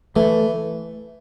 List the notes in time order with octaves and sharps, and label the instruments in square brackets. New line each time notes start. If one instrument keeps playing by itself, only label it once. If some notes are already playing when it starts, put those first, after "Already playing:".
[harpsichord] E3 [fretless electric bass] A3